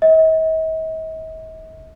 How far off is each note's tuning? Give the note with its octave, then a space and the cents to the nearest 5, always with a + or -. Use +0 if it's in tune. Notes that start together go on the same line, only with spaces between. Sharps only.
D#5 +45